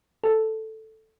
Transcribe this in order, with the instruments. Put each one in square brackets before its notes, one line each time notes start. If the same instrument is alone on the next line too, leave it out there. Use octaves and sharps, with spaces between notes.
[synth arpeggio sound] A4